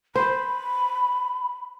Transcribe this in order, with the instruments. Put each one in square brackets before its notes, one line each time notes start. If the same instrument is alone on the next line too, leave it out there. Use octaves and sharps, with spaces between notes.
[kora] C5 [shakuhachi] B5